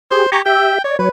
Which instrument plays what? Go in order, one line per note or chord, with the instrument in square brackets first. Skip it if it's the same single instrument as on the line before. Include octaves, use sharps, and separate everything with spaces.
[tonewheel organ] G4 G#4 [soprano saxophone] C5
[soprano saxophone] G4 [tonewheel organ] G#5 A#5 C#6
[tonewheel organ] G4 E5 [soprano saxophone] G5
[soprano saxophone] C#5 [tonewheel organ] D5
[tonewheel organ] F#3 C#5 [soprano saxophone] B4